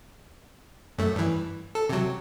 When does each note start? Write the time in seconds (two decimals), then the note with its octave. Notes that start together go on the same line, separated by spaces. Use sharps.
0.98 F#2 A3
1.16 G2 E3
1.75 A4
1.90 C3 F#3